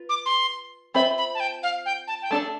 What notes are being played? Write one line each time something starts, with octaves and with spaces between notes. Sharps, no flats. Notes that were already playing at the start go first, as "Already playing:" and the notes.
Already playing: F4 B4
D6
C6
C4 F4 C5 E5 B5
B5
A5
G5
F5
G5
A5
G5
A3 D4 A4 D5 A5